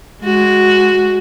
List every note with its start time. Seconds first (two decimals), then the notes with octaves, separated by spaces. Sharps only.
0.23 G#3 F#4